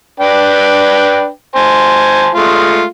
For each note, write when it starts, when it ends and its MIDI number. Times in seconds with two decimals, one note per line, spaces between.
0.20 1.28 62
0.20 1.28 71
0.20 1.28 79
1.56 2.29 72
1.56 2.29 80
1.56 2.29 81
2.35 2.84 56
2.35 2.84 57
2.35 2.84 65